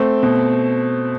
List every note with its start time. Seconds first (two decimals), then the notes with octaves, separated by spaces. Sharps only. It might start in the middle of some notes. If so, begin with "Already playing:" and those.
Already playing: A3 C4
0.23 B2